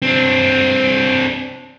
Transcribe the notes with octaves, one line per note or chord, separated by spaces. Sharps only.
C4 D4